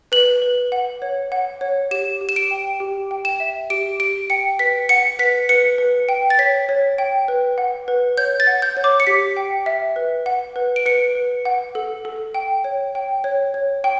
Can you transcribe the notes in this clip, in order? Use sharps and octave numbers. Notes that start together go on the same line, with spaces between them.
B4 F#7
B4
F#5
C#5
F#5
C#5
G4 E7
G4
E7
D7
G5
G4
G5
E7
E5
G4 D7
G4 D7
G5 C#7
B4 B6
F#5 C#7
B4 B6
B4 C#7
B4
G5
A6
C#5 B6
C#5
G5
B4
F#5
B4
C#5 G6
A6
F#5
G6
C#5
D6
C#7
G4 B6
G5
E5
B4
F#5
B4
D7
B4 C#7
B4
F#5
A4
A4
G5
C#5
G5
C#5
C#5
G5